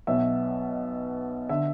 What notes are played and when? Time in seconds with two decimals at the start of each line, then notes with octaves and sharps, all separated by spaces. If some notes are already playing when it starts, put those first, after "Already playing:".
0.07 B1 B2 E5
1.49 D3 E5